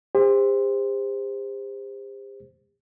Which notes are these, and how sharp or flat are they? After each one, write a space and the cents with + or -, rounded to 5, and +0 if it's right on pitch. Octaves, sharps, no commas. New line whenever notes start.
G4 +40 C5 +0